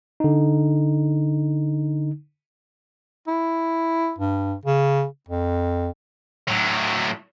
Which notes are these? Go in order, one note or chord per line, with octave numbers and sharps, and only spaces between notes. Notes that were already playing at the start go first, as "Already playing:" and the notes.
D3 D#4
E4
G2
C#3
F2
A2 F#3